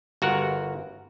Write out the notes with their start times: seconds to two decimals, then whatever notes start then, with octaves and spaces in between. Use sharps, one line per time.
0.22 G1 F#4 A#4 F#5